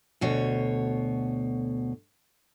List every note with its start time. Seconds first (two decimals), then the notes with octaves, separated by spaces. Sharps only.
0.21 D2 B2 C#5